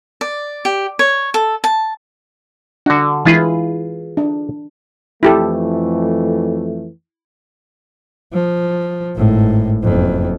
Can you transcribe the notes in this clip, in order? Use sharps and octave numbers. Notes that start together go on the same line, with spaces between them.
D5
G4
C#5
A4
A5
D3 D4 F#4
E3 G#3 E4 F4 G#4 B4
D4
F2 E3 A3 E4 G4 A4
F3
G#1 A2
F#1 F2